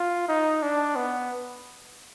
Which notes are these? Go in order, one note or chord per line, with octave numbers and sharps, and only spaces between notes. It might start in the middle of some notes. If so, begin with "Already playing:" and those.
Already playing: F4
D#4
D4
B3